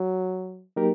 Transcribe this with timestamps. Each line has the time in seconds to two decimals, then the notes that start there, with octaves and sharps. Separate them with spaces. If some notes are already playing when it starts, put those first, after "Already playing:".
Already playing: F#3
0.76 F#3 A#3 D#4 G4 A#4